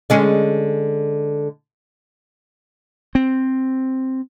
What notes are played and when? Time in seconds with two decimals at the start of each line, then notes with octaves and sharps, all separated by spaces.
0.10 D3 G#3 C#4
3.15 C4